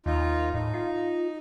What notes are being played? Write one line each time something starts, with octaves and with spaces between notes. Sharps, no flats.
D#2 D#4 F4
A2 D#4
F4